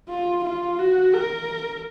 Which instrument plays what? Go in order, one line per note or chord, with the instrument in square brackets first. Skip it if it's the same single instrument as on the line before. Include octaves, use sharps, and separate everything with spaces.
[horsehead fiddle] F4
F4
F#4
A#4